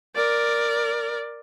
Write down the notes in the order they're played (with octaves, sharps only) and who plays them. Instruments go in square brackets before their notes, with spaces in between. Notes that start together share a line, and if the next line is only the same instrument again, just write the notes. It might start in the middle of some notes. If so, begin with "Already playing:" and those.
[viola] A#4 D5